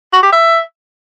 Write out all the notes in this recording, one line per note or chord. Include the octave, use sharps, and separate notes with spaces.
F#4
G4
E5